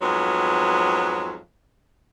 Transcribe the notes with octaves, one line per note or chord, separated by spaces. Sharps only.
F2 G#2 F#3 B3